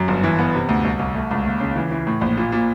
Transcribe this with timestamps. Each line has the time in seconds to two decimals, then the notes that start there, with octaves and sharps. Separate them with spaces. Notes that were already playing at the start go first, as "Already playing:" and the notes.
Already playing: F#2
0.08 G1
0.23 E3
0.39 B3
0.54 C3
0.69 D2
0.84 C2
0.99 C2
1.15 A3
1.31 C#2
1.45 D#2
1.60 C#3
1.76 E3
1.91 E3
2.07 A2
2.21 A#1
2.37 A#2
2.52 A#2